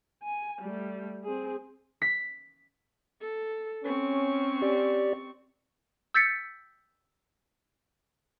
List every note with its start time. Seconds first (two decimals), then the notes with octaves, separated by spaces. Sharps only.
0.23 G#5
0.62 G3 A3
1.24 C4 G#4
2.02 B6
3.21 A4
3.84 C4 C#4 C#6
4.62 G4 D5
6.14 E6 G6 A6 B6 C#7